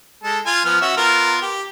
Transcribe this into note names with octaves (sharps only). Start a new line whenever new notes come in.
G#3 A4
F4 G#5
F3 B3 F6
C#4 F#4 E5
B3 F4 A#4
G4